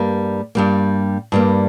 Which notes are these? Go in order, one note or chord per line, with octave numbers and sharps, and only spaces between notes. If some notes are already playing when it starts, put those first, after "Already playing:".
Already playing: G2 G3 A#3
G2 G3 A#3
G2 G3 A#3